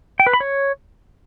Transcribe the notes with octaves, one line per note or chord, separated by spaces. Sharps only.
G5
B4
B5
C#5